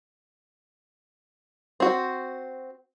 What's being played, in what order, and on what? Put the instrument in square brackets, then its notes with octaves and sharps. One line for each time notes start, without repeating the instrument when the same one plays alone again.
[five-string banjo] C4 F#4